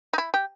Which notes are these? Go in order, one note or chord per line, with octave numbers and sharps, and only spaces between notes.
D#4
E4
G4